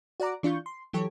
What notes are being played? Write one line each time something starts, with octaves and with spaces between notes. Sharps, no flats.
F#4 D5 F#5 A#5 D6
E3 D4 F4 C#6 G6
C6
E3 F#3 G4 A4 C#5